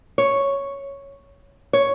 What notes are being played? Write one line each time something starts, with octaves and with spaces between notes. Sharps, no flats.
C#5
C#5